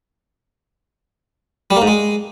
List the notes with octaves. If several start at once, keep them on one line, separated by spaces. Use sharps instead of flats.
G3
A#3
G#2
G#3